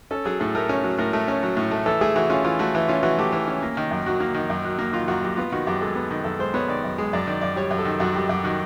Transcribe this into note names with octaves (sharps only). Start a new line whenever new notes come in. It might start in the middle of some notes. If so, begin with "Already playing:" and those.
C#4 A4
F#3 G#4
A2 A4
A3 A#4
C#4
F#3
A2 A#4
A3
C#4
F#3
A2
A3
E3 A4
A3 G#4
E3 F#4
C#4 F4
E3 F4
A3 F#4
E3
C#4 F4
E3 F#4
A3 G4
E3
C#4
A#3
D#3
F#2
F#3 F#4
A#3
D#3
F#2
F#3
A#3
D#3 F4
F#2 F#4
F#3 G4
B3 F4
D#3 F#4
F#2 G4
G#3 A4
B3
D#3
F#2 A4
G#3 C5
B3 C#5
D#3 D5
F#2
G#3
F#2 D5
D#3 D5
F#2 D5
G3 C#5
F#2
A4
D#3
F#2 F#4
G3 G4
F#2 G4
D#3 F#4